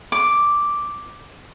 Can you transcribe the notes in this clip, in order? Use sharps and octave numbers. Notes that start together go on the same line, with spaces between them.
D6